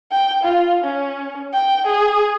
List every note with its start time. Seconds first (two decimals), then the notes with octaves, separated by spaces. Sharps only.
0.12 G5
0.44 F4
0.85 C#4
1.54 G5
1.87 G#4